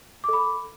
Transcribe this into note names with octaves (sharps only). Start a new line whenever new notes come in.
A4 B5 D6